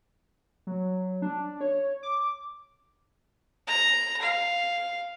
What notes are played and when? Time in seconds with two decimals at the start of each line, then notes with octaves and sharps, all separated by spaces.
0.67 F#3
1.22 D4
1.61 C#5
2.03 D6
3.68 A#5
4.22 F5